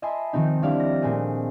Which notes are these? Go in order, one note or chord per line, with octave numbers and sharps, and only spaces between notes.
D#5 E5 G#5 A5 B5 C6
D#3 F3 C4 D#4
G3 D4 E4 D5 F5
A#6
A#2 A3 C4 G#4 D#6